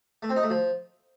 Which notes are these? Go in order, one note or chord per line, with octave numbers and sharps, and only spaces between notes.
A3
C4
D#4
A3
F3